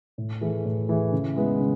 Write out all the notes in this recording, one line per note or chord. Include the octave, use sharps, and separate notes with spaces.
A2
E3 A3 E4 G#4
A2
E3 A3 E4 G#4
C#3
G#3 B3 E4
C#3